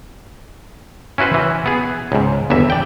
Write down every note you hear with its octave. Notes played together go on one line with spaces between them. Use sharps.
C#4 E4 F#4 B4 C5
E3
B3 G#4
C#2 G#2
G1 E2 E3 E5
D5 G5